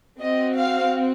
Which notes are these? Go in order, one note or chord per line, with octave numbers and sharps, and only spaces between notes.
C4 F#4 D#5
F5